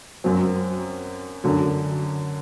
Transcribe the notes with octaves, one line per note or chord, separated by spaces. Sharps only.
F#2 F#3 C4
F#2 D3 F#3